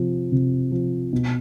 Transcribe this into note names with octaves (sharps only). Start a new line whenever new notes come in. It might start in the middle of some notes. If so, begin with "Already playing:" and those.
Already playing: C3 F3
C3
F3
B2